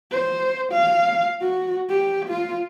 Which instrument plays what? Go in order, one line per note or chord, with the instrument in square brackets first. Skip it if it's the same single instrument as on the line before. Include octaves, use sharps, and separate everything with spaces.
[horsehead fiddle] C5
F5
F#4
G4
F4